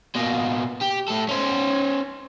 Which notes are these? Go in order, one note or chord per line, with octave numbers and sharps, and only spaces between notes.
B2 A#3
G4
A2 A4
C#4 C5